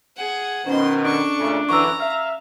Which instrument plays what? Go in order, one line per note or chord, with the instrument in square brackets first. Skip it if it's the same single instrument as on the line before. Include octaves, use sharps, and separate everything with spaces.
[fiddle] G#4 F#5
[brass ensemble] B2 D#3 [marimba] C#4 [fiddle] C5 C6
[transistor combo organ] D4 [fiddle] A4 C#6
[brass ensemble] A#2 C#3 A3
[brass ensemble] F#2 D3 E3 [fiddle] A#5 [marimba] C#6 E6
[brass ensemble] E5 [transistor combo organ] F5